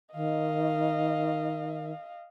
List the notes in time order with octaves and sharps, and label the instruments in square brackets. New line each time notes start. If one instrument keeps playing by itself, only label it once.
[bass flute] D#3 [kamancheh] D#5 F5